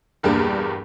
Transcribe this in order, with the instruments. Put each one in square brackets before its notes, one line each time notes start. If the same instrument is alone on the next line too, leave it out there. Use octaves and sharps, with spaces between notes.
[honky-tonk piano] A#1 E2 G2 A#3 D4 A#4